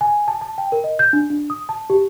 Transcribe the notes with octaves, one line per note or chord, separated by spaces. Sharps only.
G#5
A5
A5
G5
A#4
D#5
G6
D4
D4
D#6
A5
G4